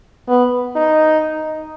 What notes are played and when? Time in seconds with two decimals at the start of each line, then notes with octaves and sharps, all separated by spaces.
0.28 B3
0.76 D#4